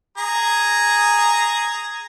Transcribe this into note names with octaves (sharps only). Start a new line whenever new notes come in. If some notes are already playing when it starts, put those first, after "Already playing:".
G#4 A#5